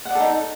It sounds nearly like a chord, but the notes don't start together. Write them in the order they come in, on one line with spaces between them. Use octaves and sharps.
F#5 D5 A4 D#4